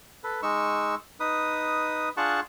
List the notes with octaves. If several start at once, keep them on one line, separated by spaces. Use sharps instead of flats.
A4 B4
G#3 D#4 C#6 E6
D#4 B4 D#6
D4 F4 G#4 F#5 A5 C#6